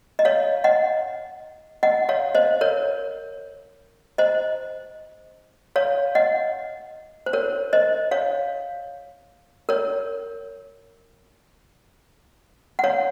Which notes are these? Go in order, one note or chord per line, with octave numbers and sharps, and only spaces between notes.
D#5
C#5 F5
D#5 F#5
D#5 F#5
C#5 F5
C5 D#5
A#4 C#5
C5 D#5
C#5 F5
D#5 F#5
C5
A#4 C#5
C5 D#5
C#5 F5
A#4 C#5
F#5
C#5 F5